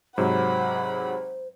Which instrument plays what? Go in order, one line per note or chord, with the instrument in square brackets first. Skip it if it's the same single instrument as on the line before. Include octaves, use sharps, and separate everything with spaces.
[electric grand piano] G#2 C3 F#3 [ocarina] C5 [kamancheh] F#5 B5